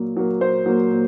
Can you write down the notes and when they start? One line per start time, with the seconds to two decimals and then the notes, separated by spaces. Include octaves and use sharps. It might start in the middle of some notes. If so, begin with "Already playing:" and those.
Already playing: A#2 F#3 A#3
0.16 F#3 A#3
0.40 A#2 C5
0.66 F#3 A#3
0.90 A#2